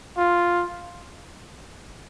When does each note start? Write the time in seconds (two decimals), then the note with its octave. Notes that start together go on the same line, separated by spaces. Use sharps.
0.18 F4